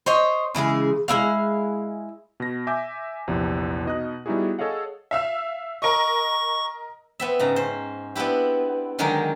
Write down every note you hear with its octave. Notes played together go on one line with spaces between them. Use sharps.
C5 C#5 D#5
C#3 E3 G#3 G#4
G#3 A#3 E4 F5
B2 A#6
E5 G#5 D6 G6
A#1 E2 C3 F3
B2 D#4 D#5 D#6 F#6
G3 B3 D#4 E4 F#4 G#4
G#4 A4 C#5 D#5 F5 F#5
E5 F5 E6
A#4 D#5 C#6
B3 C4 E5
G#2 C#3 A#5
C#4 C5
B3 C4 D4 E4 G4
D3 D#3 F#3 G#3 G4 A#4